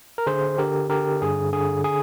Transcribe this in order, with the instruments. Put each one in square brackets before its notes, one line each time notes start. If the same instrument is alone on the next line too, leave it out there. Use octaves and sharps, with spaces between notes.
[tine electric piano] A#4
D3 G#4 C5
D3 G4 A#4
D3 G4 A#4
G2 G#4
D3 G#4
G#4